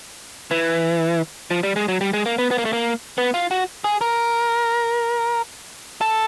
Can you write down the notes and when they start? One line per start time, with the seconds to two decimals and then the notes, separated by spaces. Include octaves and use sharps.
0.51 E3
1.51 F3
1.63 G3
1.76 G#3
1.88 F#3
2.01 G3
2.13 G#3
2.26 A#3
2.38 B3
2.51 B3
2.58 A#3
2.65 A3
2.73 A#3
3.18 B3
3.34 F4
3.51 F#4
3.84 G#4
4.01 A#4
6.01 A4